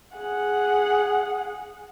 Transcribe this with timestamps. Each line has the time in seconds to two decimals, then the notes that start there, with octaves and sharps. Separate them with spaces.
0.18 G#4 F#5